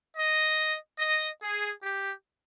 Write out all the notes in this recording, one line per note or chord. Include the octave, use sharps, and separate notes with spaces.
D#5
D#5
G#4
G4